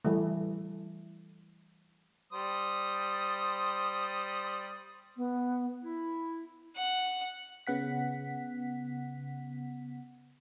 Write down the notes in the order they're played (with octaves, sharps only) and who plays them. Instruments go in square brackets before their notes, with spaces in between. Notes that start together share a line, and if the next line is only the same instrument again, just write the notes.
[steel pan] E3 G3 A3
[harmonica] G3 C5 D#6
[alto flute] B3
[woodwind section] E4
[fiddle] F#5
[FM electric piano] C#3 B3 F#5 B6